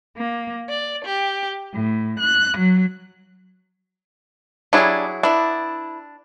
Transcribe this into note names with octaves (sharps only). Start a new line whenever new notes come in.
A#3
D5
G4
A2
F#6
F#3
F#3 G3 D4 E4 G#4
B3 D4 E4